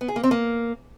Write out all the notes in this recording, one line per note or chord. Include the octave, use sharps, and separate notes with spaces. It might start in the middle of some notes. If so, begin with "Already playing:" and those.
B3
G#4
A#3
C4
A#3